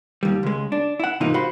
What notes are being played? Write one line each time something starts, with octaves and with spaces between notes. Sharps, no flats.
D#2 G3
C#2 G#3
D4
E4 F#5
G#2 C3 E3 A#3 D#4 F4
F#4 C5 F5 B5